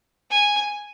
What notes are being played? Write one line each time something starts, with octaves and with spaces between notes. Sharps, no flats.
G#5